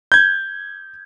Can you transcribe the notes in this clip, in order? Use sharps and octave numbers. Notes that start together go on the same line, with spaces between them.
G6 G#6